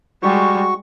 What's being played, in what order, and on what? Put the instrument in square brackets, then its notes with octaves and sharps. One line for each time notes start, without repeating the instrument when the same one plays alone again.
[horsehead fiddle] G3 G#3 [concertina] F#4 C#6